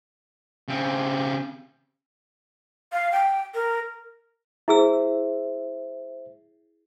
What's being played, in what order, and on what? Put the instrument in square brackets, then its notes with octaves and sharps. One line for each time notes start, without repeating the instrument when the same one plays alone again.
[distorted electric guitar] C#3 C4
[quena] F5
G5
A#4
[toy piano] E4 G#4 E6 [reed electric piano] C5 E5